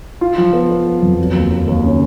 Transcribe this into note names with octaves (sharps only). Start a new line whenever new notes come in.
F4
F3
B3
B3
B3
F2
F#3
D#2
D#2
D#2
C#3